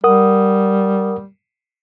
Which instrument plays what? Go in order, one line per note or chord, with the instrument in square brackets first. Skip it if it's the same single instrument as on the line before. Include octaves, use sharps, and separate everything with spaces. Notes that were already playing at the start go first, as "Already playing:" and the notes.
[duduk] G3 [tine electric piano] A#4 F#5 D#6